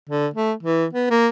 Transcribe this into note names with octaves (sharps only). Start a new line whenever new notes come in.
D3
A3
E3
B3
A#3